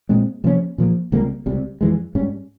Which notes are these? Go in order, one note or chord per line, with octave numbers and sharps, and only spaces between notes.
A#2 G#3 C4
C3 F3 A#3 C#4
A#2 F3 A#3
C#2 C3 G3 A#3
C#2 C3 G3
F2 E3 G#3
G#2 G3 C#4